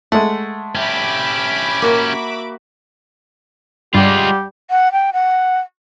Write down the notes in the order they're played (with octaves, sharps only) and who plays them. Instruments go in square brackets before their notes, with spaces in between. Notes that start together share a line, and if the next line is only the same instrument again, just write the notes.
[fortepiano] G#3 A3 [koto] F#5
[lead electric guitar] C#4 G4 [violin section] E5 B5 D6
[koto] A#3 F#4
[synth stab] G2 [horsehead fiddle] G3 F#5 [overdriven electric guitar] G#3 F4 [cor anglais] G4
[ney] F#5
G5
F#5